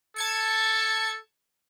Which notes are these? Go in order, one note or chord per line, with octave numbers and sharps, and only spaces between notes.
A4 A5 G#6 C#7